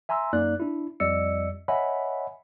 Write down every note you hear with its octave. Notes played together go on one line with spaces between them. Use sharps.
E5 G#5 A#5 C6 E6
F#2 A#3 D#4 D5 F#6
D4 E4
F2 G3 D5 D#5 E6 C#7
C#5 D#5 E5 F#5 G#5 B5